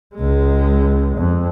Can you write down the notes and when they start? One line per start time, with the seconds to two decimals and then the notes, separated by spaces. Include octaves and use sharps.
0.16 C#2 G#3
1.16 F2